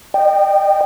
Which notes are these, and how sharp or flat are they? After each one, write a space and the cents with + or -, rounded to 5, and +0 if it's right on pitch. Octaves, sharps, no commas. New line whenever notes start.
D#5 -35 G5 +0